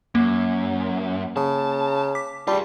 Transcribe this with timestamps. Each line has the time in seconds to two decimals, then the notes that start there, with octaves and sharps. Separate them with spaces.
0.15 F#2 A#3
1.36 C#3 A5
2.15 D6 B6
2.47 G3 F4 G#4 A5